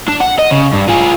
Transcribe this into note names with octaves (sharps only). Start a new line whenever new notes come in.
D4
F#5
D#5
C#3
G2
F4 G#4